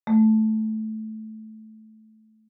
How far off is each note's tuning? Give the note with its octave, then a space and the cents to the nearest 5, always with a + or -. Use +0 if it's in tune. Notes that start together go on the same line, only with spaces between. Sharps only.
A3 -10